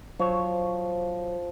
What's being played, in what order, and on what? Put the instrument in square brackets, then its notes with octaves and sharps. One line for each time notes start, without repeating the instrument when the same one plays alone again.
[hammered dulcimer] F3 [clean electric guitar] F#3 C5 C#5